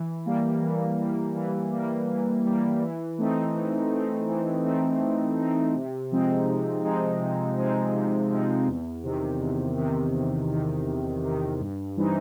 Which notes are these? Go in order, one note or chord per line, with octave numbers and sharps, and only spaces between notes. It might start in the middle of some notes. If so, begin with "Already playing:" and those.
Already playing: E3
G3 A#3
E3
G3 A#3
E3
G3 A#3
E3
G3 A#3
E3
A3 C4 D#4
E3
A3 C4 D#4
E3
A3 C4 D#4
E3
A3 C4 D#4
C3
F3 G#3 C4 D#4
C3
F3 G#3 C4 D#4
C3
F3 G#3 C4 D#4
C3
F3 G#3 C4 D#4
E2
C3 D#3
E2
C3 D#3
E2
C3 D#3
E2
C3 D#3
G2
E3 G3 C4 D#4